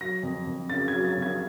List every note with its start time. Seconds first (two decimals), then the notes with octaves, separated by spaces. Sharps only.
0.01 F#3 A#6
0.23 F2
0.47 F2
0.70 C#3 A6
0.88 G#6
0.94 F#3
1.05 A6
1.17 F2
1.22 G#6